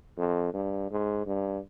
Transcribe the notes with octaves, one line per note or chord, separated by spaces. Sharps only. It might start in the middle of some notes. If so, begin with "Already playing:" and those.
F2
G2
G#2
G2